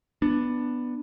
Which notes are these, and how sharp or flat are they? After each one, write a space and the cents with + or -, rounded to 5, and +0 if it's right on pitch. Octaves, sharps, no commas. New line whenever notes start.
B3 +0 D4 +10